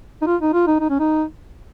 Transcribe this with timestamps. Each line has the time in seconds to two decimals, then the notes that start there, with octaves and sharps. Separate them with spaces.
0.22 D#4
0.27 F4
0.42 D#4
0.53 F4
0.67 D#4
0.80 D#4
0.90 C#4
1.00 D#4